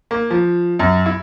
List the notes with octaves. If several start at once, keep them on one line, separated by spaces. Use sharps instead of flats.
A#3
F3
F#2
E4